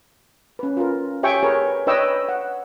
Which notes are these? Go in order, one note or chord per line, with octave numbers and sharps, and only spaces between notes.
C#4 B4
F4 A#4
G4 C#5 E5 G5 G#5 C#6
G#4 A#4 B4 C#5
D4 B4 C#5 D#5 G5 E6
F#5